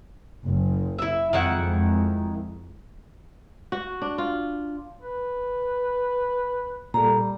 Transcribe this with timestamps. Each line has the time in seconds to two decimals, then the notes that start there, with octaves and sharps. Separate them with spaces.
0.46 F#1
0.99 E4 E5
1.33 F2 D#3 G#3 E4 F#5
3.72 F#4
4.02 D4
4.18 F4
5.02 B4
6.94 A#2 G3 A4 A#5